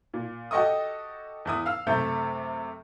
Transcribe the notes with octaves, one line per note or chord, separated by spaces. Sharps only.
A#2
F#4 G4 A4 D#5 C#6 D#6
E2 E4 D#6
F5 E6
F#2 C3 A3 A4 E5 G6